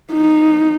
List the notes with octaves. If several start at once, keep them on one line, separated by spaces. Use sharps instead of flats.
D#4